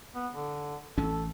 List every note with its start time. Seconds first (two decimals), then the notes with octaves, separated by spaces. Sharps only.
0.14 B3
0.32 D3
0.98 A1 E3 C#4 A4